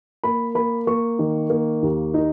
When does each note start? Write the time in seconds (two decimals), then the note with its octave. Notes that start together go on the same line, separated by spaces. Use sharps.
0.24 A#3 B5
0.55 A#3 B5
0.87 A#3 C#6
1.19 D#3
1.50 A#3
1.82 D#2
2.14 D#4